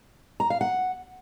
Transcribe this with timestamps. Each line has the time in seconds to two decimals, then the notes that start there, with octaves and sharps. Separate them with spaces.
0.40 A#5
0.50 F5
0.61 F#5